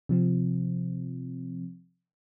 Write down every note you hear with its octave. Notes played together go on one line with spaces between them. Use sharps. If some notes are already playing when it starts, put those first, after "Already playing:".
C3 F3 C4